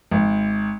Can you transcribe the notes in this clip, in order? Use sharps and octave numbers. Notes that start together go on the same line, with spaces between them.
G#1